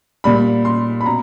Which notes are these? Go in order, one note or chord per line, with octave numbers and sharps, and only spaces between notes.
A#2 G3 B5
C6
B5
B2 A#5